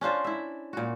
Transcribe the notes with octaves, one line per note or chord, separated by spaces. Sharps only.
C#4 D4 F4 C5
E4 E5
A#2 F#4